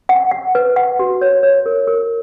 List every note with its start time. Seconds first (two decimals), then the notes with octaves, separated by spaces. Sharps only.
0.09 F#5
0.31 F#5
0.55 B4
0.76 F#5
0.99 F#4
1.21 C#5
1.43 C#5
1.66 A#4
1.87 A#4